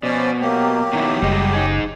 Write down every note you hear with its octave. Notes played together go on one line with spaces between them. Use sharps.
B2 F3 C#4 C5 D5
F#3 A#3 G4
B2 D#3 E4
F#1 G3 G#3 D#5
D#4 G#4